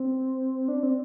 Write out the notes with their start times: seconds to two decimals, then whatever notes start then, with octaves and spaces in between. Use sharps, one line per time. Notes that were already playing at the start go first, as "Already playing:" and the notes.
Already playing: C4
0.68 D4
0.83 C4